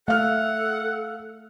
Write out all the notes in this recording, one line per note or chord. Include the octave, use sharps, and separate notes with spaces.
A3 A4 F5 F#5 F6